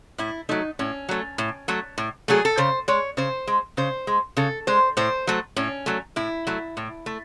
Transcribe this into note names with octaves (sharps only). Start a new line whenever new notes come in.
A2 E4
F#3 A3 D#4
A2 C#4
F#3 A3
A2
F#3 A3
A2
F#3 A3 G#4
A4
C#3 C5
G#3 C#5
C#3 C5
G#3
C#3 C5
G#3
C#3 A4
G#3 C5
A2 C5
F#3 A3
A2 C#4
F#3 A3
A2 E4
F#3 A3
A2
A3